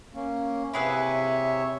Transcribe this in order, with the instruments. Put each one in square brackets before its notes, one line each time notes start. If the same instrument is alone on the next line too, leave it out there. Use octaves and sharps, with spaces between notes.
[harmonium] A#3 C#4
[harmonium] C3 C#5 E5 [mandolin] E4 G#4 B4